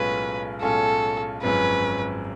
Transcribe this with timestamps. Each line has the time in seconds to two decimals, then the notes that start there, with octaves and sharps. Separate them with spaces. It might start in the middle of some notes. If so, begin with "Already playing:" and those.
Already playing: B1 A2 G#3 C#4 F4 B4
0.61 B1 A2 G#3 C#4 F4 A4
1.43 G#1 F#2 F3 G#3 C#4 B4